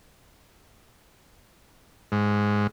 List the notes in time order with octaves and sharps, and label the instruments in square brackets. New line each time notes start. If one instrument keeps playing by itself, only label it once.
[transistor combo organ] G#2